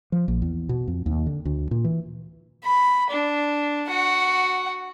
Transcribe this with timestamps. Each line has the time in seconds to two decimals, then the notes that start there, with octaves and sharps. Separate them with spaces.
0.12 F3
0.28 A#1
0.42 E2
0.69 B2
0.88 F2
1.06 D#2
1.26 D3
1.45 D2
1.71 A#2
1.84 E3
2.64 B5
3.10 D4
3.88 F#4 F#5